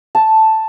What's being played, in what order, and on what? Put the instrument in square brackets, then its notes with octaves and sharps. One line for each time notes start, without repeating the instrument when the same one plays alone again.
[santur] A5